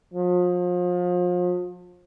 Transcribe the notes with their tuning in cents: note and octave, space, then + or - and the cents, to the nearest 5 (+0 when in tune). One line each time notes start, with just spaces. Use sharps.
F3 +35